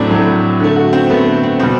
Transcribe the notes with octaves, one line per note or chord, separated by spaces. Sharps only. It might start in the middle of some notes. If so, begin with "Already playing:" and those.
Already playing: A2 F#3 A3 C4 D4 E4
A2 F#3 A3
D3 A3
F#4
C4
D3 A3 B3
C4
B2 G3 C4